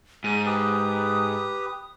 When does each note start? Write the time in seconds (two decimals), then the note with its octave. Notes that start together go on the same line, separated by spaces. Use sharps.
0.24 G#2 D#7
0.46 G4 B4 D#6